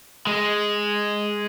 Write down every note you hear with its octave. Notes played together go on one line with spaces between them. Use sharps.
G#3